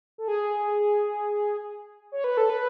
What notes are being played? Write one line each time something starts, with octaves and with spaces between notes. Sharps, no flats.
A4
G#4
C#5
B4
A4
B4